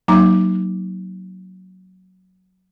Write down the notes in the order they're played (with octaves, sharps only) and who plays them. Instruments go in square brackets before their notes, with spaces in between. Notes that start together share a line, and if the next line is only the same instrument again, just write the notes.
[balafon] F#3 A#3 D#4 A#5 D6